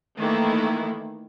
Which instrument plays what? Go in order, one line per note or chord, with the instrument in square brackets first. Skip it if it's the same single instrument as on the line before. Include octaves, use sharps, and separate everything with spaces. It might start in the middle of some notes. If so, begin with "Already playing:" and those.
[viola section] D#3 E3 A3 A#3 E4